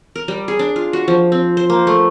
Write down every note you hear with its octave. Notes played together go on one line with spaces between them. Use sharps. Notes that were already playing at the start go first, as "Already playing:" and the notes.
A#4
G3
G#4
D4
F4
F#4
F3
C4
C5
A#3
A3